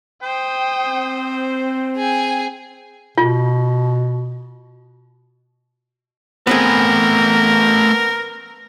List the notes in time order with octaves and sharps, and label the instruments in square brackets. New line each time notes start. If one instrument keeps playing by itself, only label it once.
[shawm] C5 [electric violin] G5 D#6
[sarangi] C4
[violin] G#4 G#5 [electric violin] G5
[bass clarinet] B2 [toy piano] F4
[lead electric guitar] A3 B4 [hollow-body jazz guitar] B3 C4 G#4 [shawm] A#4